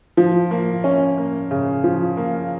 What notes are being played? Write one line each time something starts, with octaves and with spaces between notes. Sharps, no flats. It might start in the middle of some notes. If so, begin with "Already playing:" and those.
F3
A#3
C#4
A#3
C#3
F3
A#3